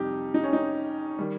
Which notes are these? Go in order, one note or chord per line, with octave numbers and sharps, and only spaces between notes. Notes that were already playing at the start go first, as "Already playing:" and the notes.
Already playing: F2 C3 G3 D#4 G4
D#4
C#4
D#4
D#3 G3